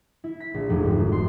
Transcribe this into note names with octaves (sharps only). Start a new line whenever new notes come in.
E4
B6
A#1
F1
G#1
F3
C6